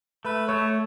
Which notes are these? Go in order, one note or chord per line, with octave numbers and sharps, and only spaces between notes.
A3 B4
A3 C#5